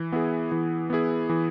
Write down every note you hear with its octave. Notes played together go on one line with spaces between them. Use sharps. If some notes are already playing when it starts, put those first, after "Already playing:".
Already playing: E3
B3 E4 G#4
E3
B3 E4 G#4
E3